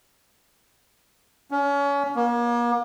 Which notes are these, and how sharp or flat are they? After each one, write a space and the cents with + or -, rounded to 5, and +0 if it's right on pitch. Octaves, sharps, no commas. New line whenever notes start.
C#4 +30
A#3 +40